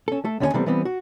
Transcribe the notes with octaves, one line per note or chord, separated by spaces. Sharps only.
C#4 A4
A3 A4
D#2 D3 C#4 D#4 C#5 G#5
C3 E3 G3 A3 B3 C4
E3 G3 B3 C4
F#4